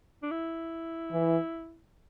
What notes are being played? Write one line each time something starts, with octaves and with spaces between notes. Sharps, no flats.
D4
E4
E3